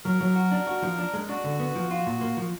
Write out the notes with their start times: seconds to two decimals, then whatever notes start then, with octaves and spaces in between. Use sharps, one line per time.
0.05 F#3 A#4
0.21 F#3
0.36 F#4
0.52 D4
0.67 F#4
0.82 F3
0.98 D4
1.14 G#3
1.29 D4 F#4
1.44 D3
1.60 B3
1.75 F3
1.91 F4
2.06 A#2
2.21 A#3
2.37 F3